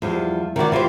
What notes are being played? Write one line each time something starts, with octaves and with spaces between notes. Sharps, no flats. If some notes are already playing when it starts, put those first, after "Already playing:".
E2 F3 G3
D#3 E4 F#4 D5
E3 F4 G4 C5